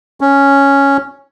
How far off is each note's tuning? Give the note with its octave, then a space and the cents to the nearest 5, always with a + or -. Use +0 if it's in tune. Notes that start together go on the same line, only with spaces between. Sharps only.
C#4 +0